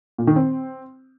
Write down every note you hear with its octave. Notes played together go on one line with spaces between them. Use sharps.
A#2
D#3
C4